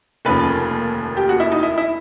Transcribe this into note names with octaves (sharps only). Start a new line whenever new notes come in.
F1 D#2 C#3 F3 B4
G4
F#4
E4
D#4
E4
E4